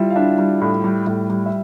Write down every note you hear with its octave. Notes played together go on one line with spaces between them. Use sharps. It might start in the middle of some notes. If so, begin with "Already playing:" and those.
Already playing: G3 E4 F4 E5
F5
D4 E4 E5
G3
A2
G3
A2
G3
E5